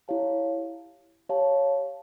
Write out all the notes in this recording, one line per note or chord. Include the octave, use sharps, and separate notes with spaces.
E4 G4 C#5 F5 A5
G4 C#5 F5 A5